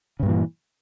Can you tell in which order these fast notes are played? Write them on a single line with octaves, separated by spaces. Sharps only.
C#3 G2 A#2 E3